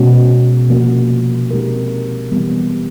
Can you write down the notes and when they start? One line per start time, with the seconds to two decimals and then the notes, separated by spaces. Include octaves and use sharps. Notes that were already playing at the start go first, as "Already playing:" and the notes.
Already playing: B2 G#3 C#4 F#4
0.68 C3 F3 A#3 C#4 F#4
1.51 G#3 C4 D#4 G4 A#4
2.31 E3 G3 B3